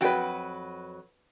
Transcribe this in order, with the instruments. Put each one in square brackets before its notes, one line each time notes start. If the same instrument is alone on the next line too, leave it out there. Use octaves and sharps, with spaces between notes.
[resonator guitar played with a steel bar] F2 F#3 G5 [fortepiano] F#4 B4